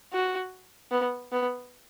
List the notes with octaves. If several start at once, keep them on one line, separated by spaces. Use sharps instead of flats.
F#4
B3
B3